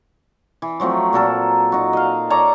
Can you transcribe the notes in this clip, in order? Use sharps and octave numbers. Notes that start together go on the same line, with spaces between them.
E3
F3 F#3 A3 C4
A#2 F#3 A4 A#4
D#4 F#4
D#5 F5
A4 C#5 D5 A#5